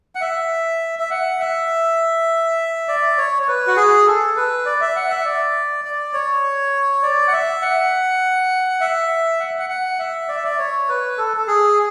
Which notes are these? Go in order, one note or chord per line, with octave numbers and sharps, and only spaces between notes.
F#5
E5
E5
F#5
E5
D5
C#5
C#5
B4
F#4
G#4
A4
B4
D5
E5
F#5
E5
D5
D5
C#5
D5
F#5
E5
F#5
E5
F#5
F#5
F#5
E5
D5
E5
D5
C#5
B4
A4
A4
G#4